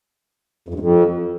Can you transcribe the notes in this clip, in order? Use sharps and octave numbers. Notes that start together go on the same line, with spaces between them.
F2
G2
F2